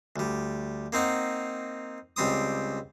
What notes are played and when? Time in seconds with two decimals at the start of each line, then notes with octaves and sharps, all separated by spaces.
0.16 D2 G3
0.93 A#3 C4 D#4 F#5
2.16 C#2 G3 C4 C6 D#6